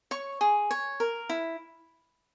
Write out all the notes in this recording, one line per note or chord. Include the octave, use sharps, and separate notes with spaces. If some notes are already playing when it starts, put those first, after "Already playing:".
C#5 C#6
G#4
C#5
A#4
E4